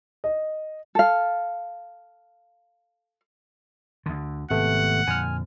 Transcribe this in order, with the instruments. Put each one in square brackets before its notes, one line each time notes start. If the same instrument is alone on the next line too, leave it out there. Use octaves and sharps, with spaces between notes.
[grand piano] D#5
[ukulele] A4 F5
[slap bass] D2 D3
[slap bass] G#1 [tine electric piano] C3 A3 B3 [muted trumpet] F#5
[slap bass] F2 A#2 D3 [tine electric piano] G#5 F6